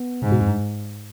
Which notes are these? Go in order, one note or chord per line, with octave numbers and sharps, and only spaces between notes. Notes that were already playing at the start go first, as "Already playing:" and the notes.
Already playing: B3
G#2 C3
B2
F2
G2